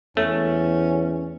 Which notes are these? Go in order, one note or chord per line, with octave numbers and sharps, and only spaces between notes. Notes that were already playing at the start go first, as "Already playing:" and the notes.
E2 A3 C#4